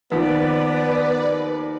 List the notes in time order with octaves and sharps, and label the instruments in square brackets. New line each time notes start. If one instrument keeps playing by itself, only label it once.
[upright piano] D#2 F3 [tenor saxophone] B3 [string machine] B4 D5